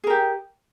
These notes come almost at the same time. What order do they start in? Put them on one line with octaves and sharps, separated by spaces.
G#4 A#4 G4